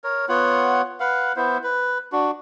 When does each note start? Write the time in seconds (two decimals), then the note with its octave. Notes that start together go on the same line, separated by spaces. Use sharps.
0.04 A#4 C#5
0.29 B3 F4 C#5 F#5
1.00 B4 F5 F#5
1.36 B3 E4 C5
1.64 B4
2.12 D4 F#4